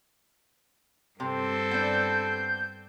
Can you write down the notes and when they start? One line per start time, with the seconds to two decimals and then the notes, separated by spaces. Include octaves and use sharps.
1.20 G2 C3 C4 A4
1.71 B3 D4 G6